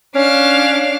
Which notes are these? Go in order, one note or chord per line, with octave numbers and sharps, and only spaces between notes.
C#4 D4 F5